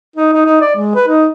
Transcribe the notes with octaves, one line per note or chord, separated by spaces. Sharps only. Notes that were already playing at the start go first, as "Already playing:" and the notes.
D#4
D#4
D#4
D5
G#3
B4
D#4